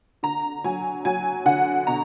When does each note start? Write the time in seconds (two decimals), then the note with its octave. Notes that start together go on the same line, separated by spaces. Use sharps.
0.23 D3 A#5
0.64 F#3 G#5
1.05 F#3 G#5
1.46 D3 F#5
1.87 B2 A#5